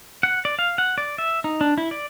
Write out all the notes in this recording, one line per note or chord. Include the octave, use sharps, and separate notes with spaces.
F#5
D5
F5
F#5
D5
E5
D#4
D4
E4
D5